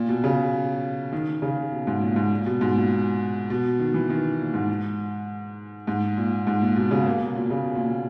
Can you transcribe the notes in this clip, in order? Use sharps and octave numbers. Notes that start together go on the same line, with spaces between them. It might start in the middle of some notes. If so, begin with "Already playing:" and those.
Already playing: A#2
B2
C#3
D#3
C#3
B2
G#2
A#2
G#2
A#2
B2
G#2
A#2
B2
D#3
E3
D#3
A#2
G#2
G#2
A#2
G#2
A#2
B2
C#3
A#3
B2
A#2
C#3
B2
A#2
B2